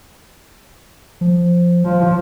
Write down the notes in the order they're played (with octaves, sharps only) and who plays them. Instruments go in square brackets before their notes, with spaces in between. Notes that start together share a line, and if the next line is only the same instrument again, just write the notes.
[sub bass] F3
[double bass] F3